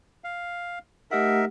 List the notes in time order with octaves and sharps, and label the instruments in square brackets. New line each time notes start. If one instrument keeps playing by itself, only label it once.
[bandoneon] F5
[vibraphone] A3 G4 F#5 [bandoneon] D#4 A#4 E5